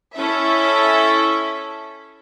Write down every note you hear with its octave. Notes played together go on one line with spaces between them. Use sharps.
C#4 E4 A4 E5